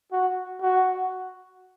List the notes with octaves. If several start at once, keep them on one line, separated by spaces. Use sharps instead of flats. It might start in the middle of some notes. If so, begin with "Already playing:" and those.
F#4
F#4